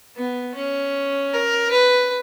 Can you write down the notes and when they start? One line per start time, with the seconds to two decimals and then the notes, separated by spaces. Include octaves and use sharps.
0.16 B3
0.55 C#4
1.34 A#4
1.72 B4